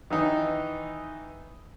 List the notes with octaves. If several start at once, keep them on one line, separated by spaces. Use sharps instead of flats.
D#3 E3 D#4